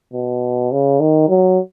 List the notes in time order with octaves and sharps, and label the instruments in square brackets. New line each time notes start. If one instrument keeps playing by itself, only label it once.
[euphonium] B2
C#3
D#3
F#3